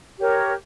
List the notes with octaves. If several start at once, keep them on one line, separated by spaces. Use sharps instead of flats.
G4 A#4 C#5